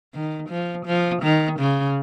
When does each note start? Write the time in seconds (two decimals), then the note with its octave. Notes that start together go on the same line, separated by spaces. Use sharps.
0.14 D#3
0.49 F3
0.86 F3
1.23 D#3
1.60 C#3